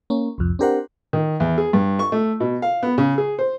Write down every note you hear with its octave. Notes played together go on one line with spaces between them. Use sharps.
A#3 C#4
C2 F2
C4 D4 G4 A#4 C5 F#5
D#3
E2
G#4
G2
C#6
A3
B2
F5
B3
C#3
G#4
C5